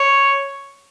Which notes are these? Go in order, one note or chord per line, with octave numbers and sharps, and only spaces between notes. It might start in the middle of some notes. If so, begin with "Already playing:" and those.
Already playing: C#5